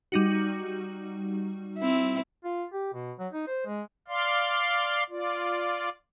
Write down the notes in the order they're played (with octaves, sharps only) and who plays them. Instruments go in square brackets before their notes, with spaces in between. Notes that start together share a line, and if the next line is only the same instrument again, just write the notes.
[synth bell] G3 D#4 F#4
[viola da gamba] C4 E4
[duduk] F4
G4
B2
F#3
D#4
C5
G#3
[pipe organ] D5 F5 C6
F4 D5